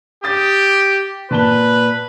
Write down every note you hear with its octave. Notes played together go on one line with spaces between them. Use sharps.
G4 D#6 A6
A#2 B4 A5 G7